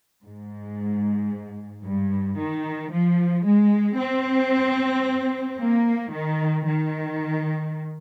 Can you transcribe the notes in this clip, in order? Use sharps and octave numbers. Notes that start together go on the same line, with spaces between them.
G#2
G2
D#3
F3
G#3
C4
A#3
D#3
D#3